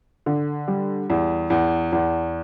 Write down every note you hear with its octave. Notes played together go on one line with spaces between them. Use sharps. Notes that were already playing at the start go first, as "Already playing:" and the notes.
D3
G3
E2
E2
E2